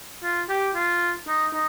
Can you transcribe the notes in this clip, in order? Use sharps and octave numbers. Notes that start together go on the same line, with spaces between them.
F4
G4
F4
D#4
D#4